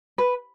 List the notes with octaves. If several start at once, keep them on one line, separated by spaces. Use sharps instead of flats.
B4